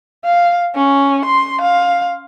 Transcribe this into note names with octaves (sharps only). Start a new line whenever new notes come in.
F5
C#4
C6
F5